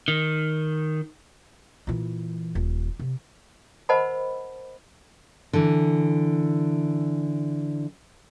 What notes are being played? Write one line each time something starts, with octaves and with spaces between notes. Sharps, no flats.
D#3
A#2 E3
D#1
C3
A#4 C5 D#5 F#5 A5 B5
D3 E3